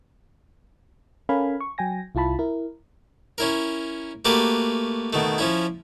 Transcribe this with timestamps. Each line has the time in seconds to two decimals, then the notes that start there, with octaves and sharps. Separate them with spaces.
1.29 C#4 A4 A#4 F5 G#5 B5
1.61 C#6
1.78 F#3 G5 G#5 A#6
2.15 C2 E4 F4 A5 B5
2.39 E4 A#4
3.38 C#4 E4 A#4
4.25 A3 A#3 F#4 G4 A#4 B4
5.13 B2 D#3 A3
5.38 F3 C#4 E4